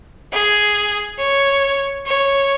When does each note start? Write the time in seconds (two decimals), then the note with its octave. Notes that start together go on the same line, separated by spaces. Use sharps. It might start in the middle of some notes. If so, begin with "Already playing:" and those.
0.33 G#4
1.19 C#5
2.06 C#5